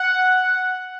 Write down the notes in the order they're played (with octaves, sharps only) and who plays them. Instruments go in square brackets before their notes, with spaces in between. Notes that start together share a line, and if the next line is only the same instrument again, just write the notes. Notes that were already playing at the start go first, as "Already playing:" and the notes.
Already playing: [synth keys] F#5